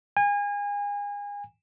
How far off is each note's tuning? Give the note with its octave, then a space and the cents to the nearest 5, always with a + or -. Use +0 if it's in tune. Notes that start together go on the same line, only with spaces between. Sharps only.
G#5 -30